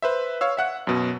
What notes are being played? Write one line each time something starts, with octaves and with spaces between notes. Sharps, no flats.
B4 C5 E5
C#5 F5 E6
E5 F#5 F#6
F#2 B2